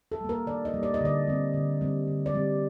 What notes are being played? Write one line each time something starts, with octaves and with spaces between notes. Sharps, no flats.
A4
G3 A#3
A#4
D#3 D5
D#5
G3 A#3
D5
D#5
D3 D5
G3 C4
D3
G3 C4
D3
D5
G3 C4